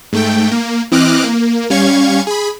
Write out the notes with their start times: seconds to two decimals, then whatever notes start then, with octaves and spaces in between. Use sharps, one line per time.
0.13 G#2 A3 G5
0.51 A#3
0.92 E3 C4 D#5 D6 F6 F#6
1.24 A#3
1.70 G3 C#4 F5 C#6 G#6
2.27 G#4 B5